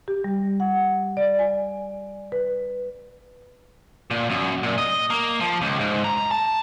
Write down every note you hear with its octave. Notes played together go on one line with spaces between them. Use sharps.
G4
G3
F#5
D5
G#5
B4
A#2
F#2
A#2
D#5
A#3
F3
C#2
G#2
A#5
A5